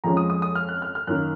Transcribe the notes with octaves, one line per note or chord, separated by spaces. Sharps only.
F2 F3 G#3 C#4 A#5
D#6
D#6
D#6
F6
F#6
F6
F6
F#2 D#3 A#3 F#6